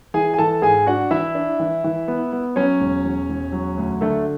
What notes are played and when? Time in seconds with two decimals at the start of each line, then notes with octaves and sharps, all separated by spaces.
0.14 E3 G#4 G#5
0.34 G#5
0.38 E3 A4 A5
0.62 G#2 G#4 G#5
0.86 D4 F#4 F#5
1.11 E3 E4 E5
1.35 D4
1.60 E3
1.84 E3
2.08 B3
2.33 B3
2.56 F#3 C#4 C#5
2.80 E1
3.05 E1
3.29 E1
3.52 F#3
3.78 D2
4.01 D3 A3 A4